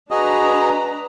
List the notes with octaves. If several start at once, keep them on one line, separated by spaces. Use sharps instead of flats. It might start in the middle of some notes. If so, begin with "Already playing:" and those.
D4 F#4 G#4 B4 D#5 A#5